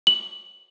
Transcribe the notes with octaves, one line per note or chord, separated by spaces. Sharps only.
F#7